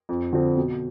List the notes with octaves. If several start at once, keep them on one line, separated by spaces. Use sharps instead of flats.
F2
D3 F3 C4
B2